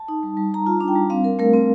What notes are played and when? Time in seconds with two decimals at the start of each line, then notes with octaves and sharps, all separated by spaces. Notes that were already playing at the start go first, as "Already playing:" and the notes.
Already playing: A5
0.08 D#4
0.23 G3
0.37 G3
0.52 G3 A#5
0.66 F4 A5
0.80 D4
0.88 G5
0.95 G3
1.10 C4 F5
1.24 C4 A#4
1.39 A3 A#4
1.53 C4